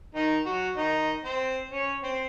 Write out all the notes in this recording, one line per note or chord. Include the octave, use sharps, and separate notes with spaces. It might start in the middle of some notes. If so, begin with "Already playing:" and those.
D#3 D#4
F#3 F#4
D#3 D#4
C4 C5
C#4 C#5
C4 C5